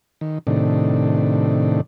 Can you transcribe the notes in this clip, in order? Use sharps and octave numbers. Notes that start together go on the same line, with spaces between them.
D#3
A2 C3 D#3 D4